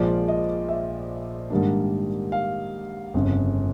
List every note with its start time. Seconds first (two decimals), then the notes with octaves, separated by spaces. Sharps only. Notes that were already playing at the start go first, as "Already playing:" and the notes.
Already playing: A#1 A#2 F3 G#3 D5
0.28 D#5
0.69 E5
1.50 G#2 D#3 G3 A#3 D4
2.32 F5
3.14 G1 F2 C#3